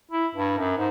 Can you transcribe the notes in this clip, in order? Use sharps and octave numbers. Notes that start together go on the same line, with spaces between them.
E4
G2
F#2
G#2